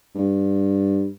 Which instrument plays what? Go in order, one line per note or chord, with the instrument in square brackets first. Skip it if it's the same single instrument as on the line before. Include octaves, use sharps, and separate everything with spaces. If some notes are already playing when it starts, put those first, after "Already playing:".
[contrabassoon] G2